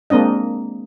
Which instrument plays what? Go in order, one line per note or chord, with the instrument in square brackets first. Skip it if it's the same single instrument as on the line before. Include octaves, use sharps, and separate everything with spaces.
[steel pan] G#3 A#3 C4 D4 D#5